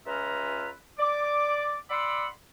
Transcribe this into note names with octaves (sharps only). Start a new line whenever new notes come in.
C#2 C#4 F4 B4 E5 A#5
D5 D6
D5 F#5 B5 C6 D6 E6